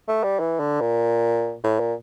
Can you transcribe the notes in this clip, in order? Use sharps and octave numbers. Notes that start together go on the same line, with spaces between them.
A3
G3
E3
D3
A#2
A2
A#2